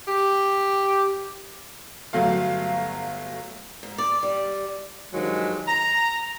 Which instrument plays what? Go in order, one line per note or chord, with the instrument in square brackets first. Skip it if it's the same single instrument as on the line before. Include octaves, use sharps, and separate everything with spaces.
[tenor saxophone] G4
[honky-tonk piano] G1 F#3 A3 F5
[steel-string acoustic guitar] G#2
D5
G3
[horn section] G2 D#3 F3 F#3 G#3
A#5